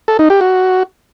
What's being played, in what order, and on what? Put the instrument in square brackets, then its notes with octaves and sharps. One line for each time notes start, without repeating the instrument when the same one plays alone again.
[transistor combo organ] A4
D#4
G4
F#4